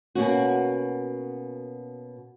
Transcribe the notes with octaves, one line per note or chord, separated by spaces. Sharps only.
B2 A#3 C#4 F#4